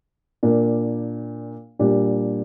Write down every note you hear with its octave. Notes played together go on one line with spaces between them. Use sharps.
A#2 A#3 D4
A#2 G3 D4 G4